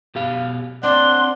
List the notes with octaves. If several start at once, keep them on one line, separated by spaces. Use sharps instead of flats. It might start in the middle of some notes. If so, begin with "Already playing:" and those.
B2 G4 F5
C4 D4 D5 F#5 C6